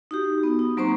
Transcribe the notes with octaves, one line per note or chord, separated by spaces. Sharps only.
D#4 F#4 G4
B3
D#4
F#3 A#3 C4 C5 A#5 C#6